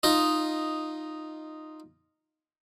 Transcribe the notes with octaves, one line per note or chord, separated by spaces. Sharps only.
D#4 F4 D#5